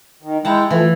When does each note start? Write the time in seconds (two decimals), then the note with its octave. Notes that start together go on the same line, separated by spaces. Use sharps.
0.23 D#3
0.45 G#3 E4 F#5 G5 A5 A#5
0.70 E3 F3 A3